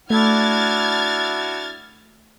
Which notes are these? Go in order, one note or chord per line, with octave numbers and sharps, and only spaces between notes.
A3 D4 E4 F#4 F6 G#6 A6